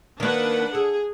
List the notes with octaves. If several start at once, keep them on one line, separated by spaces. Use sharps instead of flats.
D#3 A#3 D4 B4 F#5
G#4 A4